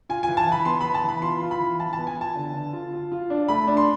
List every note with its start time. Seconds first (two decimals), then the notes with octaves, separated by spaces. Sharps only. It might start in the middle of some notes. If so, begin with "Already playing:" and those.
0.09 F4 G#5
0.23 G#5
0.28 E3
0.37 A5
0.47 E3
0.52 B5
0.65 B3 C6
0.81 B3 B5
0.94 A5
1.04 E3 B5
1.22 F4 C6
1.42 F4
1.51 B5
1.60 E3
1.79 E3 A5
1.93 A5
1.99 B3
2.07 G#5
2.17 F4 A5
2.36 D3
2.54 D3
2.73 F4
2.93 F4
3.12 F4
3.30 D4
3.48 A3 B5
3.67 D4
3.77 C6